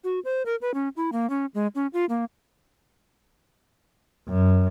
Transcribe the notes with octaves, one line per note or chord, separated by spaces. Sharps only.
F#4
C5
A#4
B4
C#4
E4
A#3
C#4
G#3
C#4
F4
A#3
F#2